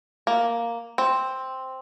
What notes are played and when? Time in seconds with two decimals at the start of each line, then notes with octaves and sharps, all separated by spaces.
0.27 A#3
0.98 C4